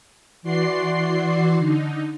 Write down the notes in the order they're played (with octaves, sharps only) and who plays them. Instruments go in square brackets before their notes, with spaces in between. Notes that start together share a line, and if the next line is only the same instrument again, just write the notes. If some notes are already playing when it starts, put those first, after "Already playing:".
[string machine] E3 F#4 D5 C6 C7
D3 D#4